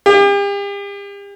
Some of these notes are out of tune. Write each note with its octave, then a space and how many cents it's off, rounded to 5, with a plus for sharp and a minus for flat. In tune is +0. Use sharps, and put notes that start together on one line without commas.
G4 +40